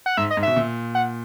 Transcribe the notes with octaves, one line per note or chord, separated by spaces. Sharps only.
F#5
G#2 E5
D#5
G#2
B2 E5
A#2
F#5